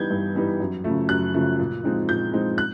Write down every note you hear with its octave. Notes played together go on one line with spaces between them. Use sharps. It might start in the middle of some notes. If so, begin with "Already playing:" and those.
Already playing: E3 G3 B3 D#4 G6 G#6
G2
E3 G3 B3 D#4
F#2
C#3 F3 A3
F#2 F#6
C#3 F3 A3
A#2
F3 G#3 C4 D#4
A#2 G6
F3 G#3 C4 D#4
F#6